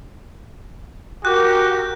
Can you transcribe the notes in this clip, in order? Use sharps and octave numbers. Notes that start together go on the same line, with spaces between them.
F#4 G4 A#4 F#6